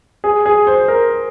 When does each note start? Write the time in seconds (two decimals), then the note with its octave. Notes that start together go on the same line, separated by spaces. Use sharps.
0.24 G#4
0.46 G#4
0.67 C5
0.88 A#4